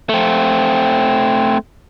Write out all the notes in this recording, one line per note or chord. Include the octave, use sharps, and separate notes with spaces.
A3 C4